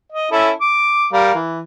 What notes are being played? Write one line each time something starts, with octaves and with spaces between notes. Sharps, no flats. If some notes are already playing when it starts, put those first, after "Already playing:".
D#5
C#4 E4 A4
D6
G3 A#4 F5
E3